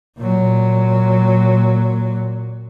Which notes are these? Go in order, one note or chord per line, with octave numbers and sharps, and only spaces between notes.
A#2 F#3